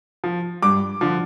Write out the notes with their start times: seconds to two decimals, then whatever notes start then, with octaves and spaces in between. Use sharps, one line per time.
0.24 F3
0.62 G2 D6
1.01 D3 F3